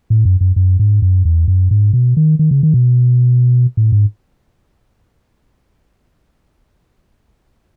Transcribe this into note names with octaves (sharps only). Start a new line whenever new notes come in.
A2
F#2
F#2
F#2
G#2
F#2
E2
F#2
G#2
B2
D#3
D#3
C#3
D#3
B2
A2
G#2